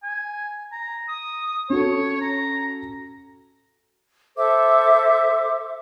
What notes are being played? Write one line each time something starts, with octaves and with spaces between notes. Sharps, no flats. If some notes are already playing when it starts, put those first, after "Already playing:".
G#5
A#5
D#6
C#4 F#4 A4 C#5
A#5
A4 C5 E5 D6